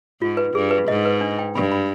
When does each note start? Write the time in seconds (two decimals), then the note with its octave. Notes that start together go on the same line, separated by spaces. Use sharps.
0.21 G#2 F4
0.37 B4
0.54 G2 G#4
0.71 B4
0.88 G#2 D#5
1.05 B4
1.21 D4
1.39 G5
1.55 G2 B5
1.72 B5